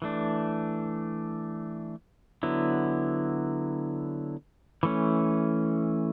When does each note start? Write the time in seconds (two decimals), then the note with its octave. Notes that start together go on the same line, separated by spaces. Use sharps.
0.02 E3 A3 D4
2.43 D3 F#3 B3 E4
4.83 E3 A3 C#4